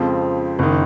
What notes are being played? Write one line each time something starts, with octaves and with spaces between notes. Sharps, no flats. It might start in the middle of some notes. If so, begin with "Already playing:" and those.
Already playing: F2 C#3 F3 G#3 C4
F#1 D#3